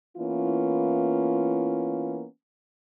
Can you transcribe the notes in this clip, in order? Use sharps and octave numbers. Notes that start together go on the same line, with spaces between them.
E3 A#3 B3 C#4 E4 F4